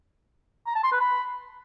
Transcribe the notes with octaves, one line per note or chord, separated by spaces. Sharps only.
A#5
A5
C6
B4
B5